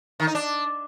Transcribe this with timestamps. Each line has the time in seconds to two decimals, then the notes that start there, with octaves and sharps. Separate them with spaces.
0.20 D#3
0.27 D#4
0.35 D4